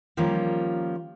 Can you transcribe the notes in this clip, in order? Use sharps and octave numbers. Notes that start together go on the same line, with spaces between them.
D#3 F3 G3 A#3 C#4 F4